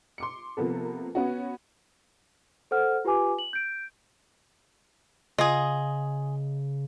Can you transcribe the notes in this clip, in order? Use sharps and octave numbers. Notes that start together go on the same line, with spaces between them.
C6 D6 C#7
C3 F3 A#3 B3 A4
B3 C#4 F#4
A4 C5 F#5 F6
F4 G4 B4 G#5 D6
F#7
G6 D7
C#3 F4 G#4 D#5